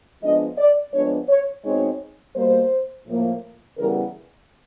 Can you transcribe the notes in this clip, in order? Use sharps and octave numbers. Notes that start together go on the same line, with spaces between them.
F3 G#3 B3 D4 D#5
D5
F3 G#3 B3 D4 C#5
C#5
B2 G#3 C4 D#4 C#5
B2 G3 A#3 C5
A2 F3 A#3
C#3 E3 G3 B3 A#4